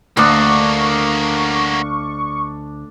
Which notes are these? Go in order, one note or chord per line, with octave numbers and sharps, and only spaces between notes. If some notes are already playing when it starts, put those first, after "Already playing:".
D2 A#3 D4 F#4 D#5 F5 C#6